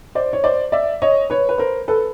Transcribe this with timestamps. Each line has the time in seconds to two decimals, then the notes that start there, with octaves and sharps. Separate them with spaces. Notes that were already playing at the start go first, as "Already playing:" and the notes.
0.15 C5 D5
0.33 C#5
0.44 C5 D5
0.72 D5 E5
1.02 C#5 D#5
1.30 B4 C#5
1.49 B4
1.58 A#4 C5
1.88 A4 B4